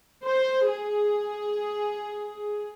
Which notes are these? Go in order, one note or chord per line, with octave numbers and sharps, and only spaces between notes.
C5
G#4